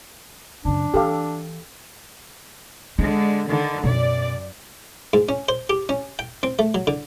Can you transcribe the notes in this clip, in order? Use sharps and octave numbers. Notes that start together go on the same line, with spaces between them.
F#2 C#3 D4
E3 G4 A4 F5
D3 G#3 D4
D3 D#3
F#2 B2 D5
G#2
C#4
C5
G4
C#4
G5
C4
A3
F#3
D3